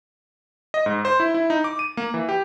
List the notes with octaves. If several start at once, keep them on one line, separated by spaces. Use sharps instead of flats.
D#5
G#2
C5
E4
E4
D#4
D6
D#7
A#3
E3
G4